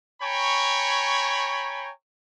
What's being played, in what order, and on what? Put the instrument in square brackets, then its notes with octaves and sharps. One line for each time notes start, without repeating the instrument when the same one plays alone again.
[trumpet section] C#5 G5 G#5 A#5 B5 C#6